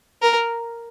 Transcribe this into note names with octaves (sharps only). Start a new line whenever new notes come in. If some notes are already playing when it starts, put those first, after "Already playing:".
A#4